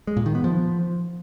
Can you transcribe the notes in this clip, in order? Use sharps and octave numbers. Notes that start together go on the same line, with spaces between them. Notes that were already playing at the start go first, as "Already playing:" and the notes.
G#3
A#2
D#3
B3
F3